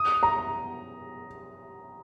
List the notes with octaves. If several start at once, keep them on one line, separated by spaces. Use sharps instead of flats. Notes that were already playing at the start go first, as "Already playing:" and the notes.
Already playing: D#6
A#5